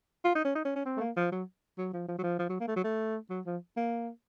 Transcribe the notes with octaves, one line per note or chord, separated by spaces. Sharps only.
F4
D#4
C#4
D#4
C#4
C#4
C4
A3
A#3
F3
F#3
F#3
F3
F3
F#3
F3
F3
F#3
A#3
A3
F#3
A3
F#3
F3
A#3